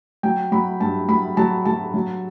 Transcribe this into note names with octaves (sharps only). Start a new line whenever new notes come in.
F#3 G5
F#3 B5
G2 A5
F#3 B5
F#3 A5
F#3 A5
F#3